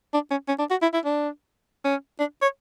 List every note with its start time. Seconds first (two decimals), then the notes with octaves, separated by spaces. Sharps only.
0.13 D4
0.31 C#4
0.48 C#4
0.59 D4
0.71 F#4
0.82 E4
0.94 E4
1.05 D4
1.85 C#4
2.19 D4
2.42 C#5